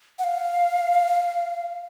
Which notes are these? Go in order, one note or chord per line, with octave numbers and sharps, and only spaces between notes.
F#5
F5